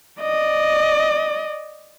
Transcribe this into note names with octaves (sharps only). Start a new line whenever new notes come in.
D5 D#5